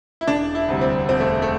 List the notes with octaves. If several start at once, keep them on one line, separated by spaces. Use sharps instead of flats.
E4
E1 D4
E4
D2 C3 G3
C4
E1 C4
A3
A3